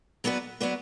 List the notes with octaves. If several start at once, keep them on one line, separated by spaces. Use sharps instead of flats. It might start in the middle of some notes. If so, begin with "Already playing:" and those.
F#3 B3 D4 F#4 B4
F#3 B3 D4 F#4 B4